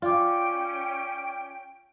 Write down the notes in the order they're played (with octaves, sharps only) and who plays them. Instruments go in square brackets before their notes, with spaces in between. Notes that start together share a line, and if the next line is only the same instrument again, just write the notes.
[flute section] C#4 G5 [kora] F4 [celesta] D5 D6